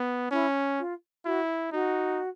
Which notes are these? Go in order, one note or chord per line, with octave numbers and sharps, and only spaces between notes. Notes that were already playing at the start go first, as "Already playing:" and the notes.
Already playing: B3
C#4 E4
F4
E4 F#4
D#4 F#4